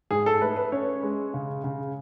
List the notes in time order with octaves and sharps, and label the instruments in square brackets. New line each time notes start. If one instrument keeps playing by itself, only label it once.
[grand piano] G#2 [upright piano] G#4
[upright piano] A4
[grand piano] A3 [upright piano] B4
[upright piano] B4
[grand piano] C#4 [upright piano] C#5
[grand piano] G#3
C#3
C#3